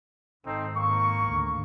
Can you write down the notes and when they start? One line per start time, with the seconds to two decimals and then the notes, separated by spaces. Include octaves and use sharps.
0.46 G#1 C4 D#4 A4
0.76 A#3 C#6
1.25 G#1 D2